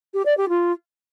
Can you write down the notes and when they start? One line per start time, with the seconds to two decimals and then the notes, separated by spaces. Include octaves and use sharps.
0.14 G4
0.26 D5
0.37 G4
0.49 F4